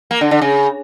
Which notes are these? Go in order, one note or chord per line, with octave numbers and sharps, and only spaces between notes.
A#3
D3
D3
C#3